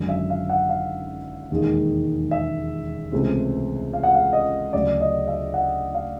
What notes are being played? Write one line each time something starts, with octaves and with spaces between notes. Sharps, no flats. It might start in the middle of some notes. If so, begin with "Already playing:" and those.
Already playing: G#1 F#2 D3 F#3
E5
F5
F#5
F5
E1 D#2 D#3 G#3
E5
C#2 C3 E3 A3 C4
F5
F#5
F5
D#5
D2 C#3 F#3 A3 D5
D#5
E5
F#5
F5